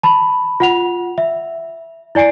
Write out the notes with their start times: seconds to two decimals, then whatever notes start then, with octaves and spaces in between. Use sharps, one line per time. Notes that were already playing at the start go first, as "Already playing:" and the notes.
0.03 A5 B5
0.60 F4 F#5 F7
1.18 E5
2.15 E4 D5 G#5 C7 D7